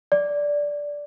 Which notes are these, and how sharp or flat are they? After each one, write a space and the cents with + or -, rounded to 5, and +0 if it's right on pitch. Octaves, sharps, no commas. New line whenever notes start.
D5 -5